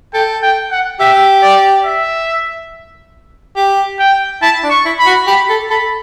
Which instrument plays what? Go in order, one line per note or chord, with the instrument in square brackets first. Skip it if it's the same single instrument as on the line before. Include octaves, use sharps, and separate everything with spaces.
[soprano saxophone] A4 [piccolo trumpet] G5
[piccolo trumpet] G5
F#5
[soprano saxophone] G4 [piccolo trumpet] E5
[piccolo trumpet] D5
E5
[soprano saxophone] G4
[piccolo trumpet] G5
[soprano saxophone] E4 [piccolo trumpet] A5
[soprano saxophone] D4
[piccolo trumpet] C#6
[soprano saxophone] E4
[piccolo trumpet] B5
[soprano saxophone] F#4
[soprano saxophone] G4 [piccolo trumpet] B5
[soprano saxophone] A4
[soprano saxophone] A4 [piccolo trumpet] B5